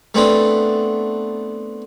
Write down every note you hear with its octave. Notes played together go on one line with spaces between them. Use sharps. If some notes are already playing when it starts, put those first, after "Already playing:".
A3 B3 C4 D4